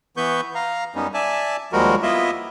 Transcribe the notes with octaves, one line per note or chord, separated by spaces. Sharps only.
E3 B3 B4 C#6 G6
F5 A#5
F#2 G3 B3 C#4 D#4
D5 E5 G#5 A5
D#2 F3 G3 G#3 F#4 A#4
A#3 B3 E4 F4 D#5 E5